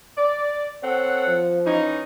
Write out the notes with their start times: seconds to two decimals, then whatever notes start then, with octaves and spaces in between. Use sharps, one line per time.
0.17 D5
0.83 C4 A4 C#5 F#5
1.27 F3
1.65 E3 C#4 D#4